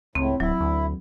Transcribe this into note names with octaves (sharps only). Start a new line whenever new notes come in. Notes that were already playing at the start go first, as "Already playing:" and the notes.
C#2 A2 C4
D1 F#3 E4
D2